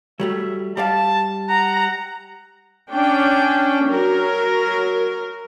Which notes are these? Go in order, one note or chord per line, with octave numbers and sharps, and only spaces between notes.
F#3 G3 A3 E5
G3 D5 F5 A5
F#5 A#5
C#4 D4 G5
F#3 A#4